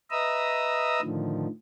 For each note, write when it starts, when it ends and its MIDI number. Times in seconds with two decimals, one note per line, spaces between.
0.11 1.01 71
0.11 1.01 75
0.11 1.01 76
0.11 1.01 82
0.11 1.01 87
0.11 1.01 88
1.02 1.47 45
1.02 1.47 50
1.02 1.47 51
1.02 1.47 53